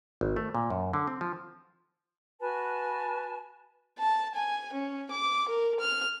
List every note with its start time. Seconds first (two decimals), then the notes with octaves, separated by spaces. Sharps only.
0.21 G#1
0.36 A3
0.55 A#2
0.70 F#2
0.93 D3
1.07 C4
1.21 F3
2.40 F#4 B4 G#5 A5
3.99 A5
4.35 G#5
4.73 C#4
5.11 D6
5.48 A#4
5.80 F6